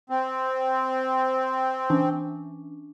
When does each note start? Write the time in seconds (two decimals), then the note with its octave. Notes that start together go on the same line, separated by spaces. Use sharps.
0.10 C4
1.90 E3 C#4 D4